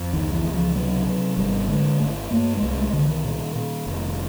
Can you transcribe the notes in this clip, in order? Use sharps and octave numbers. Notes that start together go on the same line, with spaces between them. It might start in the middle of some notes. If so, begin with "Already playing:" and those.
Already playing: F2
C#2 D#3
E3
C#2
F3
C3 F#3
C3
G#1 G3
D3 G#3
G#1 A3
G2 A#3
G#3
C2 A3
G#3
C2 D3
D#3
A#2
A#2
F1